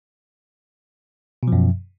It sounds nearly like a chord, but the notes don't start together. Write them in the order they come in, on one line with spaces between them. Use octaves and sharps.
B2 F3 F#2